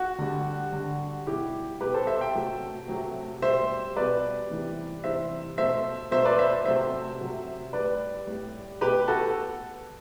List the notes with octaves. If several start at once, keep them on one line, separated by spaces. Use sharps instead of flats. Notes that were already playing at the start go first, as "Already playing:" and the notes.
Already playing: F#4
D3 G3
D3 G3
B2 G3 E4 G4
B2 G3 G4 B4
A4 C5
C5 E5
E5 G5
C3 F#3 A3
C3 F#3 A3
B2 G3 C5 E5
B2 G3 B4 D5
C3 E3 G3
C3 E3 G3 C5 E5
B2 F#3 A3 C5 E5
B2 F#3 A3 C5 E5
B4 D5
C5 E5
C3 F#3 A3 C5 E5
C3 F#3 A3
A2 G3 B4 D5
A2 G3
B2 A3 G4 B4
F#4 A4